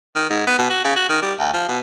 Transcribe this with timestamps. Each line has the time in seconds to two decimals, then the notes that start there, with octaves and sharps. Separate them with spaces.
0.15 D#3
0.30 G#2
0.47 B3
0.58 B2
0.70 F#4
0.84 C#3
0.96 F#4
1.09 D#3
1.22 G3
1.39 D2
1.54 F3
1.68 B2